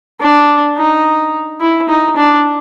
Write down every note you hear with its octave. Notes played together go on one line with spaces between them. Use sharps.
D4
D#4
E4
D#4
D4